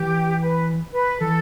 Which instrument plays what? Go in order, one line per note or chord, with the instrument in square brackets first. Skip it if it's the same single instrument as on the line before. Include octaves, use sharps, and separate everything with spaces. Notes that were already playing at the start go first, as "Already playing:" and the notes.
Already playing: [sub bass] E3 [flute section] G4
[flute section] B4
B4
[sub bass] E3 [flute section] A4